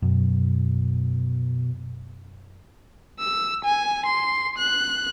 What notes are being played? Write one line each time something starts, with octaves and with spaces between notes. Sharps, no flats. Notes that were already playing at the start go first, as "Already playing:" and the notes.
F#2 B2
E6
G#5
C6
F#6